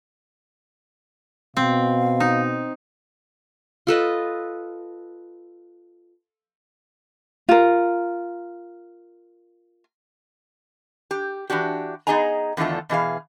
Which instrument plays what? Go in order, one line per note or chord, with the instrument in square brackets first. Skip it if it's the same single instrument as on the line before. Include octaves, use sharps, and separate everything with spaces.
[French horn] B2 [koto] C4 [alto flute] F5
[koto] D#4
[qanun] F4 A4 B4 D#5
[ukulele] F4 A#4
[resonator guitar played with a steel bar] G4
E3 F#3 D4 F#4 G4
B3 D#4 G#4 D#5 G#5 A#5
E2 D3 D#3 A3 F4 A4
B2 E3 G#4 F5